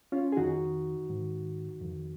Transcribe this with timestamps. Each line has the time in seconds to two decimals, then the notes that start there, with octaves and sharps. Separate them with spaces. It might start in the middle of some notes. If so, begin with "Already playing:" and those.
0.12 C#4 F4
0.32 G#4
0.37 F2 D#3 D#4 F#4
1.10 G#2 D#3
1.81 F2 D#3